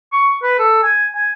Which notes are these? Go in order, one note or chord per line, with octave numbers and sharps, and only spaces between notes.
C#6
B4
A4
G#5
G#5